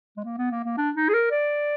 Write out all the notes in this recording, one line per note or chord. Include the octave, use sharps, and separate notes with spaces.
G#3
A#3
B3
A#3
A#3
D4
D#4
G#4
A#4
D5